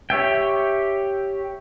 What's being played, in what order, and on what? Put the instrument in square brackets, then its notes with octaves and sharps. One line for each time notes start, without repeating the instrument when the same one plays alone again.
[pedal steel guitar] G4 C#5 E5 G5